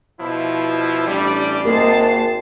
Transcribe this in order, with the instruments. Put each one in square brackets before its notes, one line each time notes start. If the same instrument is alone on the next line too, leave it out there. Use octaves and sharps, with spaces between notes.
[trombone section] B2 F3 E4
[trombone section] A1 G3 [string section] D4 D5
[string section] G#1 A5 C7 [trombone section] G#2 C3 G#3 [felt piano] A#3